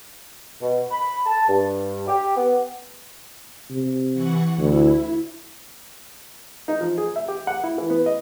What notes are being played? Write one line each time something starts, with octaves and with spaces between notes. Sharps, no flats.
B2
B5
A5
G2
G4
B3
C3
E3 F#5 C#6
D2 E4
D#4
F3
G#4
E5
G4
F#5
E4
E3
B3
D#5